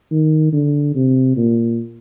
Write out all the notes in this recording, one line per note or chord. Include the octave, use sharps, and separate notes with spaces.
D#3
D3
C3
A#2